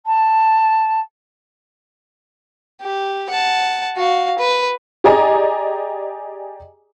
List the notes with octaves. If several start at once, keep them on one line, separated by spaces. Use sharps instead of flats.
A5
G4
F#5 A5
F#4 F5
B4
G4 G#4 D5 D#5 G#5 A#5